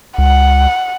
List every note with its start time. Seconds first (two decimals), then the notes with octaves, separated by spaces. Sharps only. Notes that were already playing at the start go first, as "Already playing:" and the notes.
0.18 C#2 F#5